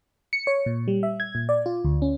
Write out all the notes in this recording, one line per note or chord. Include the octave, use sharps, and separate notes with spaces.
C#7
C#5
A#2
G3
E5
G#6
A#2
D5
F4
D2
C#4